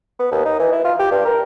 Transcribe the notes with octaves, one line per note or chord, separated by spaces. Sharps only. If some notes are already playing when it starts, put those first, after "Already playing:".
B3
D#2
D#4
E3
E4
F4
G4
G2
A#4